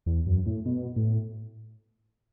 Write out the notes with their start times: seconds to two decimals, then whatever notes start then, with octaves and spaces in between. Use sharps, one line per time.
0.06 E2
0.26 F#2
0.46 A2
0.66 B2
0.96 A2